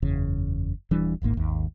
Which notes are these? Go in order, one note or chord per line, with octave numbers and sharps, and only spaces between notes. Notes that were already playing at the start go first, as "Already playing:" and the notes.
F#1 E2 C#3
D#1 E3 G3 D4
D1 G#1 G#2 A#3
G#1 D#2